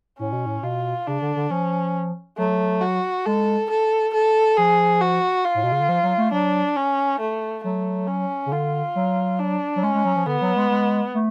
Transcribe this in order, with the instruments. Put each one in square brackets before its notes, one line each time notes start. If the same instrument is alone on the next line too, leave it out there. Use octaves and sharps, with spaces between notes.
[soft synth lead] A2 [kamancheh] C#4
[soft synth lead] B2
A2
[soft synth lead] B2 [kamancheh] F4
[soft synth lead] C#3 [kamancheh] D4
[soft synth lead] D3
D3
[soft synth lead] F3 [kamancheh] C#4
[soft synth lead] F#3 [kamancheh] A3
[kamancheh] F#4
[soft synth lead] G#3 [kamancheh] A4
[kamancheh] A4
A4
[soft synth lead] F3 [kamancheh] G#4
[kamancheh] F#4
F4
[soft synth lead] A2
B2
C#3
D3
F3
F#3
A3
[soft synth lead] F#3 [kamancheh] D4
[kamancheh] C#4
A3
[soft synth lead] F#3 [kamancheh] A3
[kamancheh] C#4
[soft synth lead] C#3
[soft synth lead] D3 [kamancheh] F4
[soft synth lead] F#3
[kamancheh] D4
[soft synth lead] F#3
[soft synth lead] G#3 [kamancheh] C#4
[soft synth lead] G#3
F#3
F3
[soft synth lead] D3 [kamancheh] B3
[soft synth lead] F#3
G#3
G#3
A3